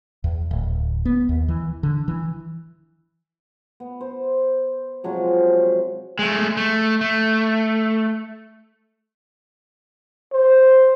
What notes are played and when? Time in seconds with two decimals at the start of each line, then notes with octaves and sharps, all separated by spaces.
0.24 E2
0.51 D1
1.05 B3
1.29 D#2
1.48 E3
1.83 D3
2.08 E3
3.80 B3
4.01 C5
5.04 C3 F3 F#3 G#3
6.19 G#3 A3
6.57 A3
7.01 A3
10.32 C5